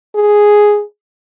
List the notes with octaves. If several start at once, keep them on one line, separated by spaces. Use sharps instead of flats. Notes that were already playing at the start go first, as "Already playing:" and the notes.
G#4